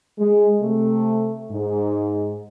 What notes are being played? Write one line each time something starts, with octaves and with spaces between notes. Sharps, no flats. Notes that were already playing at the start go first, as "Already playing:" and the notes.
G#3
C3 A3
G#2